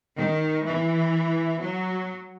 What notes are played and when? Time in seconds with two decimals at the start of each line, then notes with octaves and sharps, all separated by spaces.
0.17 D#3
0.65 E3
1.62 F#3